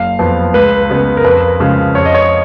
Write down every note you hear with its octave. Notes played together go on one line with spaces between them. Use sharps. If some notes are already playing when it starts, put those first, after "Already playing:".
Already playing: F#1 F5
F2 F3 B3
C#2 B4
C#3 G#3 B3
A#4
F2 B4
C#3 F3 G#3
F2 C#5
D#5
C#5